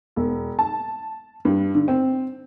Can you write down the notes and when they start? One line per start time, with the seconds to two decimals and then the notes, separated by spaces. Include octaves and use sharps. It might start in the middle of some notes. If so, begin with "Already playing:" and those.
0.16 E1
0.59 A5
1.45 G2
1.75 D3
1.88 C4